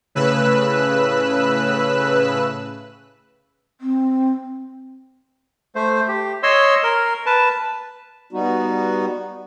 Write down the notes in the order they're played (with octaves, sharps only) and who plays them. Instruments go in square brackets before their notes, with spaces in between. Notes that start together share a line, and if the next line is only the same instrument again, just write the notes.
[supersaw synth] A2 C#3 B4 E6 F#6
[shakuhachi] C4
[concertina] A3 C5
G4
C#5 D#5 C6 E6
A#4
B4 A5
[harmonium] G3 B3 D#4 F#4